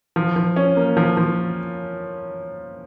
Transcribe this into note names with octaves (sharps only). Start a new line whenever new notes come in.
F3
F3
C#4
A#3
F3
F3